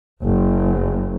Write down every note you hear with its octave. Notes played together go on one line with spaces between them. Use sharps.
F#1